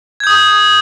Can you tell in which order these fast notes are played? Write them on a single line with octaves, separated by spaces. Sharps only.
G#6 G6 D#6